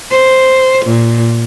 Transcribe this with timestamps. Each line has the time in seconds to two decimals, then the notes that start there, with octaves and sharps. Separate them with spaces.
0.11 C5
0.85 A#2